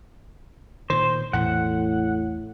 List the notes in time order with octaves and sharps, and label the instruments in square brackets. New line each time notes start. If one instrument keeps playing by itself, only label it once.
[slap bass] A#2 D#3 [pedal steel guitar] C5
[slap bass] A1 E2 [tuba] A2 [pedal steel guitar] F#5